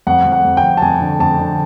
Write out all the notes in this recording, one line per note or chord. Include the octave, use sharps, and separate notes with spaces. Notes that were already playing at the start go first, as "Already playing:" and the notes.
F2 F#5
F2
F#5
F2
G5
F2
A5
F2 G#5
D3
F2 A5
D3